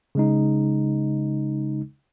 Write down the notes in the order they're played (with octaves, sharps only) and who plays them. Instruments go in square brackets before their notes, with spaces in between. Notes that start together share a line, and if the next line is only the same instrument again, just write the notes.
[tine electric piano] C#3 G#3 D#4